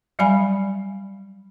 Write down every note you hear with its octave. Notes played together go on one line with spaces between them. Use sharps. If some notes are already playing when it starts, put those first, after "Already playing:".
F#3 G3 D5 F5 G#5 B5